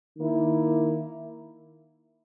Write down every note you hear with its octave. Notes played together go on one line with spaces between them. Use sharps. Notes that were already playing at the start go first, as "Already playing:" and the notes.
D#3 A#3 E4